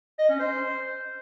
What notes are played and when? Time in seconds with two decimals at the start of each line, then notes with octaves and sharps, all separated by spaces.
0.19 D#5
0.29 C#4
0.40 C5